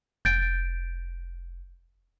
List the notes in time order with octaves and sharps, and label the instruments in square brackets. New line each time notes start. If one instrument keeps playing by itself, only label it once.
[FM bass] F1 [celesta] G6 A6 D7